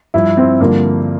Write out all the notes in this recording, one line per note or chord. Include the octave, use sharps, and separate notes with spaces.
G2 F3 E4
C4
G2 D3 F3 A#3